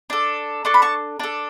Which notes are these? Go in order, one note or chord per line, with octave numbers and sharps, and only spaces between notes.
D4 A4
D4 A4 C#6
B5
A5 C#6
D4 A4